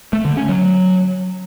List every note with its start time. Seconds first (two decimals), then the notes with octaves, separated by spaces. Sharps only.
0.13 A3
0.25 D3
0.37 C#4
0.49 F#3